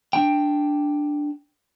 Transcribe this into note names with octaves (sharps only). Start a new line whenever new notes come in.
D4 G5